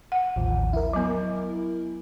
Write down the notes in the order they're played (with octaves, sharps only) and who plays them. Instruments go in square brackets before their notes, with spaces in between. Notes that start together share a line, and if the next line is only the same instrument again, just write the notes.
[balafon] F#5
[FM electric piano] A1 D#2 F3
E4 A#4
[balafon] F#3 B3